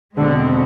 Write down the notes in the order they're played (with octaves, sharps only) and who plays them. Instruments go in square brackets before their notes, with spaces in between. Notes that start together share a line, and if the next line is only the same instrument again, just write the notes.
[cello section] E2 B2 G#3 C4 [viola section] D3